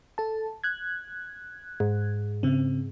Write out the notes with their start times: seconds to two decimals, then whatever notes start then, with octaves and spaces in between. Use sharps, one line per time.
0.18 A4 A5
0.64 F#6 G#6
1.80 G#2
2.43 C#3 C4